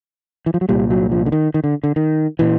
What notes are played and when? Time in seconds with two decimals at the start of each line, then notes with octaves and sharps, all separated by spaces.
0.46 E3
0.54 F3
0.61 F#3
0.69 C2 A#2 G3
0.90 F#3
1.11 F3
1.26 D3
1.32 D#3
1.54 D#3
1.64 D3
1.84 D3
1.96 D#3
2.39 A#2 E3